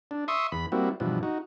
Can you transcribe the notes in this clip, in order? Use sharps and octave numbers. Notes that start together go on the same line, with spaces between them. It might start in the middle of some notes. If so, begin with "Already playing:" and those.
D4
E5 C6 C#6 D#6
E2 B5
G3 A#3 C4 E4 F#4
G2 B2 E3 F3
D#4 F#4